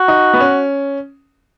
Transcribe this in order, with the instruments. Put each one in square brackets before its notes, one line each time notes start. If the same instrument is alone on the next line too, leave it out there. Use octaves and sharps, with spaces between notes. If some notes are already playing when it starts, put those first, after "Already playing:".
Already playing: [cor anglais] F#4
[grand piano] D#4
B3
C#4